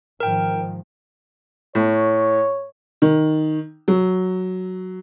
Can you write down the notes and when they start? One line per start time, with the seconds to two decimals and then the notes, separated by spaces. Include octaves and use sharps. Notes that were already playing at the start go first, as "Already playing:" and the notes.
0.20 G#2 D#3 F3 A#4 G5
1.75 A2 C#5
3.02 D#3
3.88 F#3